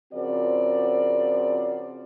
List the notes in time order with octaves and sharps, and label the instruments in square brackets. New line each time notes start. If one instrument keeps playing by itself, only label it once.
[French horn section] C#3 F3 C4 F#4 A#4 D5